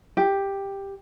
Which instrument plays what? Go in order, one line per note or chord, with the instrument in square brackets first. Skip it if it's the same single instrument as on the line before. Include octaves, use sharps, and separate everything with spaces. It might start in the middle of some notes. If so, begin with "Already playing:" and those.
[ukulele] G4